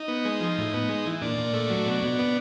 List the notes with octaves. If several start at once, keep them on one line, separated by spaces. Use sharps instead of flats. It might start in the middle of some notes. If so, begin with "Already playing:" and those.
Already playing: D#4
B3
G#3
F3
A2
B3
G#3
E3
A#2 D4
A#2
A3
F#3
B2
B2
B3